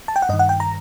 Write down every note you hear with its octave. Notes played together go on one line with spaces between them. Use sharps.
A5
G5
F#5
G2 D#3 D#5
F#5
G5
A#5